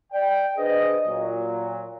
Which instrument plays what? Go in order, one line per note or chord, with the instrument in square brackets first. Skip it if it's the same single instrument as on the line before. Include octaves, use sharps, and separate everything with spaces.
[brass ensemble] D5 G5
D4 G#4 B4 C5 D#5
A#2 F#3